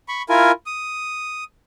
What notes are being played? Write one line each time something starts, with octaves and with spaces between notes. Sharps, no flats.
B5 C#6
E4 F4 A#4 G#5
D#6